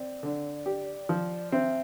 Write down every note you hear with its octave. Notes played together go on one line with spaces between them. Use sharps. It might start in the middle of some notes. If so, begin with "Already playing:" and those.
Already playing: C4 D5
D3
G4
F3
C4 E5